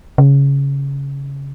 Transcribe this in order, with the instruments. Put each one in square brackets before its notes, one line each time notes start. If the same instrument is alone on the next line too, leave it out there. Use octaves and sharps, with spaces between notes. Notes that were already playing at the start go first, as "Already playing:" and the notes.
[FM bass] C#3